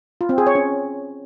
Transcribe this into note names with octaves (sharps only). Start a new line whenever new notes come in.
F4
C4
G#4
C#5
C#4